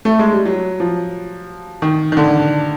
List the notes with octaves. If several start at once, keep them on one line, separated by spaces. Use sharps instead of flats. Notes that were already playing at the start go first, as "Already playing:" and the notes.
A3
G#3
G3
F#3
F3
D#3
D#3
D3